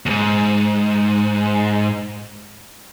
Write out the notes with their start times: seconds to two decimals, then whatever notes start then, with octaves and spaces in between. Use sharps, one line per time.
0.06 D#2 G#2